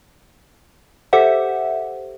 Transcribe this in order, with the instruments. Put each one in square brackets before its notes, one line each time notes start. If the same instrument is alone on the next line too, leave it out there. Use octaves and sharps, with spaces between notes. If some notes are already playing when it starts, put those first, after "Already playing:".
[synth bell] G4 A4 C5 E5 F#5